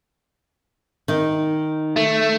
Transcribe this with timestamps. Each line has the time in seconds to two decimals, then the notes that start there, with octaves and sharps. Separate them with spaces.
1.08 D#3 D#4
1.97 A3